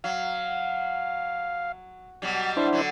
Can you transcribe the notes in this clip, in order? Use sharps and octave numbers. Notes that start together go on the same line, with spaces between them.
F#3 F5
B2 F#3 G3
D4 E4 C5
D3 F#3